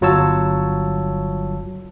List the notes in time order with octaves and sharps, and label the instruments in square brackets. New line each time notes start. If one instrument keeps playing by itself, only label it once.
[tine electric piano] G1 F#3 F4 C#5 A5 E6